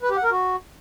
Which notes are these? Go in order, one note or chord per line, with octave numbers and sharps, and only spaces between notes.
B4
G4
F#5
A#4
F#4